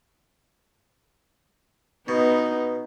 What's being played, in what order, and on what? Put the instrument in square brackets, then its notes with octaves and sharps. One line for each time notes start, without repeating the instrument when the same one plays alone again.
[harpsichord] B2 [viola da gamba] B3 D#4